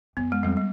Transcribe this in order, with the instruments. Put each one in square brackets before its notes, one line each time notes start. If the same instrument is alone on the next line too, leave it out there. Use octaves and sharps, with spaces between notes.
[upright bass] F#2 [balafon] B3
[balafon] G#3
[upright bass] F2 [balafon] G3
[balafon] G3